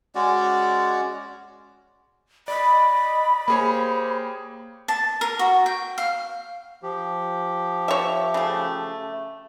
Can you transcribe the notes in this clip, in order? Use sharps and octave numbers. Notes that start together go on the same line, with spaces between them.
G#3 C#4 F#4 D5
D5 D#5 B5
A#3 G4 G#4 C5 C#5
A5
A#4
F#4
G5
F5
F3 G4
C#5 E5
C#3 A3